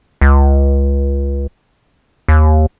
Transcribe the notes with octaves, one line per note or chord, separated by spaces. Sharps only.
C#2
D#2